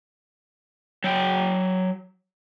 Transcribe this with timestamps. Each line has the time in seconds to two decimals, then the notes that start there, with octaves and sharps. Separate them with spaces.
1.04 F#3 G5